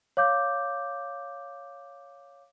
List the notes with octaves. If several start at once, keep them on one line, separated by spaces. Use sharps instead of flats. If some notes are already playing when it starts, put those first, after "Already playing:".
C#5 F5 D6 G6